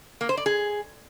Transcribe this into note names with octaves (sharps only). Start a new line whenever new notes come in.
A#3
C5
D5
G#4